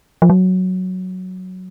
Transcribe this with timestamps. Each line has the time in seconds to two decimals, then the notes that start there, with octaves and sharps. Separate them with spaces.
0.22 F3
0.30 F#3